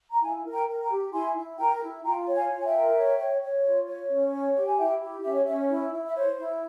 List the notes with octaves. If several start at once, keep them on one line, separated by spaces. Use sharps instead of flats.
A#5
E4 F5 G#5
A#4
G5 A#5
A#4
G5 A#5
G4
E4 G#5 C6
E4
A#4 G5 A#5
E4
F4 G5 A#5
C#5
F5 G#5
F4
G#5
E5 G5
A#4
C#5
C#5
C#5
F4
C#5
C#4
C#5
G4
G#5
E4 E5 G5
G4
C#4 E5
C#5
C#4 E5
E4 C#5
E4
E5
C5 C#5
E4